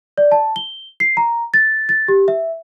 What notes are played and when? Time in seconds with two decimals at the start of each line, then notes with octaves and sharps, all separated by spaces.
0.18 D5
0.32 A5
0.56 G7
1.00 C7
1.17 A#5
1.54 A6
1.89 A6
2.08 G4
2.28 E5